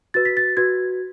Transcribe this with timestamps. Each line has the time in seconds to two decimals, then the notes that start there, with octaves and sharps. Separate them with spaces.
0.14 F#4 B4 A6
0.25 B6
0.37 A6
0.57 F#4 B4 G#6